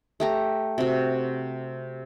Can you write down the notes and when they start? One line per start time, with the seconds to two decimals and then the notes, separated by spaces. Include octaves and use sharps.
0.20 A3 G4 A#5
0.78 C3 F#4